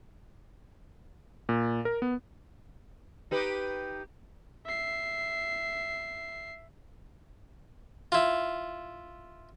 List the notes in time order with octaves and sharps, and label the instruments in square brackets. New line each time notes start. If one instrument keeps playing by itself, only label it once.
[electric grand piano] A#2
A#4
B3
[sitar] D#4 G4 B4
[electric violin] E5 C7
[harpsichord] E4 F4